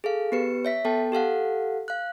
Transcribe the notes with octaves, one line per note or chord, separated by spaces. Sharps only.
G#4 A4 F5
B3 G4 B4 C#7
C#5 E5 B6
B3 A4 G5 A5
G4 A4 F5 F#5
F5 F#6